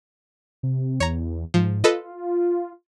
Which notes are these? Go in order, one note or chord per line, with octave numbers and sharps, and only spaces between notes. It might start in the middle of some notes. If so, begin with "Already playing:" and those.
C3
E2 C#5 A#5
G#2 F3
F4 A4 B4 D#5